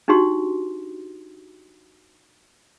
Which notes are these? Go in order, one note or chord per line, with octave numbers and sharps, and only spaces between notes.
D4 D#4 F#4 G4 C6